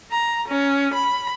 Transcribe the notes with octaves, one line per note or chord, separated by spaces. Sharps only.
A#5
C#4
B5